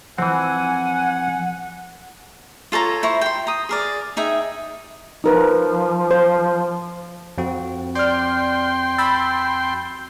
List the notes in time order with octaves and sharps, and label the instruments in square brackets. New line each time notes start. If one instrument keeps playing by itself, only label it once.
[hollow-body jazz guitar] F2 [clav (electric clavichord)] E3 C4 [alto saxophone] F#5 [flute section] G#5
[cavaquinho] F4 A4 C#5 A#5
E4 C5 A#5 C#6
G5 C6
A#5 D#6
G#4 A#4 D5
D#4 G#4 E5 G5
[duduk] F3 [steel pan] D#4 A#4 B4
[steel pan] C5
[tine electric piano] F2 C4 F#4
[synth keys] D5 F6 [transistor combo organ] G5 C6
[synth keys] B5 E6 A6